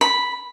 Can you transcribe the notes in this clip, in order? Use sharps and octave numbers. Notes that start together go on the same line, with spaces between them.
B5